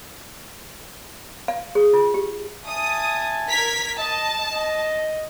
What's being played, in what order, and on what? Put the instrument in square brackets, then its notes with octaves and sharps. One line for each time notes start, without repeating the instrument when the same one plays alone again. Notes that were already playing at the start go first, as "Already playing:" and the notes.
[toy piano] F5
G#4
F4
G4
[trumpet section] E5 G#5 A5 [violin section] D#6
[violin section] A#4 G#6 B6
[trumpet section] D#5 [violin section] A5
[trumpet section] D#5